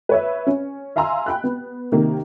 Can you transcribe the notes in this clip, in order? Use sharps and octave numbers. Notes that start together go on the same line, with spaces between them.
B4 C#5 E5
C#4
E5 F5 G#5 A#5 C6 E6
G5 B5 F#6
B3
C3 D#3 A#3